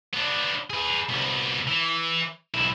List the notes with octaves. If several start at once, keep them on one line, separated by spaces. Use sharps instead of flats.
B3 D4
G#4 B4
C2 B3
E3
B1 E4